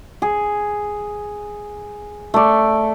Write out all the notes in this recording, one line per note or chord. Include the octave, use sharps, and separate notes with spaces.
G#4
A3 D5